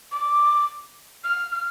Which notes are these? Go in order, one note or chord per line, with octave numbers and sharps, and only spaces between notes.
D6
F6
F6